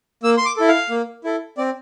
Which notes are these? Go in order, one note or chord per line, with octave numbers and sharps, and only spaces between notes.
A#3 E6
C6
D6
E4 A4
F5
A#3
E4 A4
C4 D5